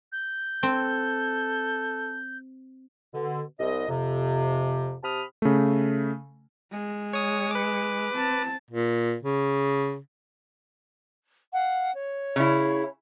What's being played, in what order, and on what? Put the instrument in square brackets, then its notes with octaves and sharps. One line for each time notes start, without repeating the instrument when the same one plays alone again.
[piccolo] G6
[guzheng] C4 [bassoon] A4
[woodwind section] B2 D3
C2 D#5
F2 C3
C3 G4 A5 B5 D#6 F6
[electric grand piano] C#3 A3
[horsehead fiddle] G#3
[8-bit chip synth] C#5 D#6
B4 D6
[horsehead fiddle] C4 A5
[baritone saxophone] A#2
C#3
[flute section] F5 F#5
C#5
[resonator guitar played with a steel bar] C#3 E4